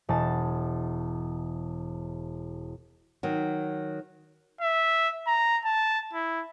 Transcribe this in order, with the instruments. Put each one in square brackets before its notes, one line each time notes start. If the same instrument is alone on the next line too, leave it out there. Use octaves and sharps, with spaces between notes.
[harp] E1 A5
[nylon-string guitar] D#3 F#3
[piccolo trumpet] E5
A#5
A5
E4